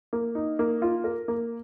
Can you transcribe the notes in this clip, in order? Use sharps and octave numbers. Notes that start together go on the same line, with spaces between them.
A#3
D#4
A#3
F4
A#4
A#3